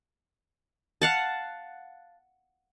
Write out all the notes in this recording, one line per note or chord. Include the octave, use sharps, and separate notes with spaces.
F5 F#5 A5